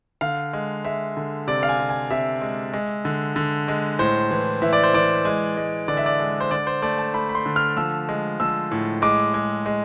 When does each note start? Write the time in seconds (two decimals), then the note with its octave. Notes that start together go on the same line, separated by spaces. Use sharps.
0.21 D3 F5
0.53 G#3
0.85 G#3 E5
1.17 D3
1.47 C3 D5
1.63 F5
1.69 G#5
1.79 C3
1.89 G#5
2.10 C3 E5
2.42 G#3
2.73 G#3
3.05 D3
3.36 D3
3.68 G#3
3.99 A2 C5
4.31 E3
4.62 E3 E5
4.73 D5
4.83 C5
4.94 E3 D5
5.25 G#3
5.57 G#3
5.88 D3 D5
5.97 E5
6.06 D5
6.20 G#3
6.40 C5
6.51 D3 D5
6.67 C5
6.82 A3 D5
6.98 A5
7.14 A3 B5
7.29 B5
7.35 C6
7.46 D3
7.56 F6
7.77 F3 E6
8.09 G#3
8.40 F3 E6
8.71 A2
9.02 G#3 D6
9.34 G#3
9.66 G#3